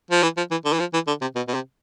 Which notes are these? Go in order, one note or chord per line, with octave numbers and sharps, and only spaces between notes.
F3
E3
F3
E3
D3
E3
F3
E3
D3
C3
B2
B2
C3